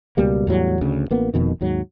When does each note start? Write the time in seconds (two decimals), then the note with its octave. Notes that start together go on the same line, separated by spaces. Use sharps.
0.17 C#2 B2 G3 A#3
0.47 E2 A2 F#3 G3
0.81 D2 C#3
1.11 A1 A#3 B3
1.34 F1 F2 B2 D#3
1.61 D#2 G#2 F#3